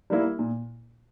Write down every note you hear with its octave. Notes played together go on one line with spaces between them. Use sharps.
G3 A#3 E4
A#2